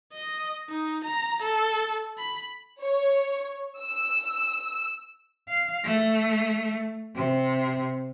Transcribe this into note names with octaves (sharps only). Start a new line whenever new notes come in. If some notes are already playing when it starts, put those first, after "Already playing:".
D#5
D#4
A#5
A4
B5
C#5
E6
F5
A3
C3